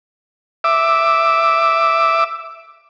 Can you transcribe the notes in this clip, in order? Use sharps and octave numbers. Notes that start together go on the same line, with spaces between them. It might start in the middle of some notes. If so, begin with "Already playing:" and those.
E5 D6